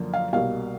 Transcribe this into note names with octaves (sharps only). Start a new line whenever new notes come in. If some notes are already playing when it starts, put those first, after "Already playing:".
Already playing: F#2 D3 F3 A#3
F5
C2 B2 G3 A#3 F5